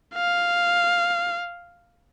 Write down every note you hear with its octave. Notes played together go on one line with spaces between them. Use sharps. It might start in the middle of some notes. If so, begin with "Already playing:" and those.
F5